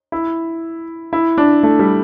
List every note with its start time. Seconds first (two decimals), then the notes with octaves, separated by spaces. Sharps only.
0.12 E4
1.13 E4
1.38 D4
1.63 A3
1.79 G3